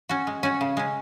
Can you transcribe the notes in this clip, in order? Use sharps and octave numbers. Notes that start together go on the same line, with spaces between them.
C#4 F#4
G#3
C#4 F#4
C#3
G#3 C#4